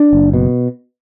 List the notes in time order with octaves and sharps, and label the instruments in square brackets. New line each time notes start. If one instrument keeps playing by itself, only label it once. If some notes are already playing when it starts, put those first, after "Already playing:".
Already playing: [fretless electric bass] D4
F#1
B2